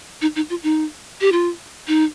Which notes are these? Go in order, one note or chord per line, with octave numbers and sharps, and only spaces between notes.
D#4
D#4
F4
D#4
G4
F4
D#4